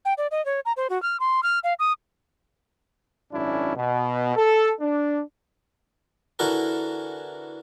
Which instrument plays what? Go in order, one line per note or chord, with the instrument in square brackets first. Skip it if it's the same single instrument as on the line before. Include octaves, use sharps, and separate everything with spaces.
[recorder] G5
D5
D#5
C#5
A#5
C5
F#4
F6
C6
F6
F5
D#6
[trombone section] G#1 F#2 C#4 D4 E4
B2
A4
D4
[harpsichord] D3 E3 E4 F#4 A4 A#4